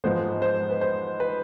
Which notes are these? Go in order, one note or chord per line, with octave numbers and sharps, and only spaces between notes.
G#2 F3 G#3 B3 C5
C5
B4
C5
B4